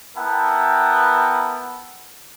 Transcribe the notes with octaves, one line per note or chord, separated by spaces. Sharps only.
B3 E4 A#4 F#5 G5 A5